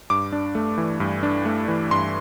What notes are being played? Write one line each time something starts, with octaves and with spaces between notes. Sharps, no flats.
G2 D6
D4
A3
E3
G2
D4
A3
E3
G2 C6